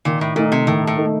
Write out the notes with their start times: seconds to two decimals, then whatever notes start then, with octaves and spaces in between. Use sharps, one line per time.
0.05 A#2 D#3
0.21 A2
0.36 A#2 A3 D#4
0.52 C3
0.67 A2 D#3
0.87 A2
0.97 A3 D#4